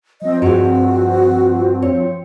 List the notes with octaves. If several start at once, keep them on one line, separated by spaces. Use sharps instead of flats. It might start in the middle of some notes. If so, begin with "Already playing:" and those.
F3 C4 D#5
G2 G#3 F#4
C#5